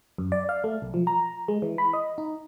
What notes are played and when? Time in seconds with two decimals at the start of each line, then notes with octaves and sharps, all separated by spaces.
0.18 F#2
0.32 D5
0.49 F5
0.64 A3
0.82 B1
0.94 F3
1.07 A#5
1.48 G#3
1.62 E3
1.78 B5
1.93 D#5
2.18 D#4